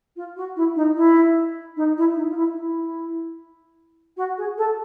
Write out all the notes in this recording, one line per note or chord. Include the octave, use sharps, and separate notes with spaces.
F4
F#4
E4
D#4
E4
D#4
E4
D#4
F4
E4
E4
F#4
G#4
A4